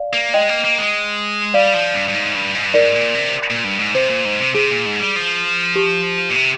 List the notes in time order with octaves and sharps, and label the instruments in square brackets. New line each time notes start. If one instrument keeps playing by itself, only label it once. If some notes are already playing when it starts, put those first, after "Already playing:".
Already playing: [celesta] D5 F5
[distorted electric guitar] A#3
[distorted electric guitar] G#3 [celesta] D#5 G5
[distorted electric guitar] A#3
A#3
G#3
[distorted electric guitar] G3 [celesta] D5 F5
[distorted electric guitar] F3
G2
G2
G#2
G2
G#2
G2
[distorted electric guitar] G#2 [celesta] A#4 D5
[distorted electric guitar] A#2
C3
A#2
G2
G#2
[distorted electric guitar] C3 [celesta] C5
[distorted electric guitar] A#2
G#2
C3
[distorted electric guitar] C3 [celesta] G#4
[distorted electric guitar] A#2
G#2
G3
F3
[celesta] G4
[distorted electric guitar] A#2
C3